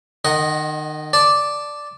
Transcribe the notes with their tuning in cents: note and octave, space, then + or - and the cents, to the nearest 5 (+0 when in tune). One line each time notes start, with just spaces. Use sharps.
D#3 -30 D#5 -5 F#5 +0
D5 +0 A5 +0